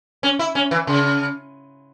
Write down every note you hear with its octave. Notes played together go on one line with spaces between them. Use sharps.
C#4
E4
C#4
E3
C#3